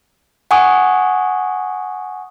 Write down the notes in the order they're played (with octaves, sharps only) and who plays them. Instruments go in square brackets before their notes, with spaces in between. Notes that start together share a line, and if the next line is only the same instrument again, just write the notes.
[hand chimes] F#5 G#5 C#6 D#6